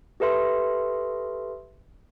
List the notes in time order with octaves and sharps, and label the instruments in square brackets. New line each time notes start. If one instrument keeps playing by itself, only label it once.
[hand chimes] G4 A4 B4 E5 C6